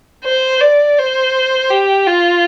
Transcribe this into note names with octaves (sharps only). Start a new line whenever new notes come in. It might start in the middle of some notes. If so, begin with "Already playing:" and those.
C5
D5
C5
G4
F4